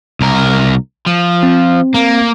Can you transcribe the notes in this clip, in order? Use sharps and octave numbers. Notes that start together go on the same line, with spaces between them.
C2 A#4
F3
C4
A#3